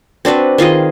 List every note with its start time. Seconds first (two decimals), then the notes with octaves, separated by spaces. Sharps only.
0.25 C4 D4 F#4 B4
0.58 D#3 F4 G#4 D#5